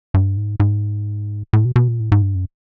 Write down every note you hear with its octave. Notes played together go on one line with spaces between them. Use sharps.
G2
G#2
G#2
A2
B2
B2
A#2
A2
G#2
G2
F#2